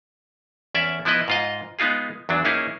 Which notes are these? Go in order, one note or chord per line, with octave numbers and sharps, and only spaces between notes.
E2 C#4 D5 E5
F3 B3 E4 B4 D#5
G#2 F4 D#5
G#3 B3 D#4 F4 G#4
E2 F#3 D4
A#3 C#4 D#4 E4 G#4